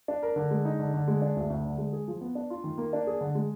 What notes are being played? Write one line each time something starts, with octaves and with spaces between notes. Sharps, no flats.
D4
A#4
D3
G#3
D#4
D3
D3
G#3
D4
D2
D2
D3
G#3
G#4
F3
B3
D4
F4
D#3
A#3
D4
G#4
D3
G#3